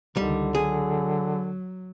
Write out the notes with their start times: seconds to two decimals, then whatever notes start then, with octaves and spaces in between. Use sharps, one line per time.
0.17 C#2 D3 D#3 G3
0.55 F#3 G#4